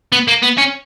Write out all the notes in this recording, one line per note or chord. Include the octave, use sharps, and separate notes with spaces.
B3
A#3
B3
C#4